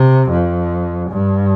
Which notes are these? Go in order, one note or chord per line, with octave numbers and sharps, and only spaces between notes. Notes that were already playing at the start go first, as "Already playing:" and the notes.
Already playing: C3
F2
G2